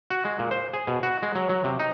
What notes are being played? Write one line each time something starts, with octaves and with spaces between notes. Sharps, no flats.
F#4
G#3
A#2
C5
G#4
B2
F#4
G#3
F#3
F#3
C3
D#4